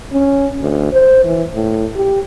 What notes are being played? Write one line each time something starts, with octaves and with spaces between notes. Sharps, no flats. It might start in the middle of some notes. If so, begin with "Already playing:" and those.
C#4
D2
C5
E3
A2
G4